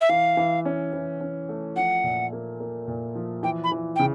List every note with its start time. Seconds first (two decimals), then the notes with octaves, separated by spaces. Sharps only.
0.01 E5
0.09 E3 F5
0.37 E3
0.65 C#4
0.93 E3
1.21 C#4
1.49 A3
1.76 F3 F#5
2.04 A#2
2.33 A#3
2.60 A#3
2.88 A#2
3.15 F3
3.43 E3 G5
3.64 B5
3.72 E3
3.96 C#3 G5